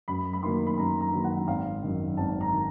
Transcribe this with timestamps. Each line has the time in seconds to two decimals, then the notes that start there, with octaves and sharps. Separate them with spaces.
0.08 F#2 B5
0.33 B5
0.43 D#3 F#3 A#3 D#4 C6
0.67 B5
0.78 F#2 A#5
1.01 A#5
1.13 D#3 F#3 A#3 D#4
1.24 F#5
1.48 G#1 F5
1.83 F#2 D#3
2.17 G#1 A5
2.41 A#5
2.52 D#3